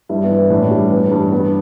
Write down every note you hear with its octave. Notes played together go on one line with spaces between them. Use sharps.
G2 E4
B3
E3
B3
A2 D4
G3
E3 B3
G2
G2 B3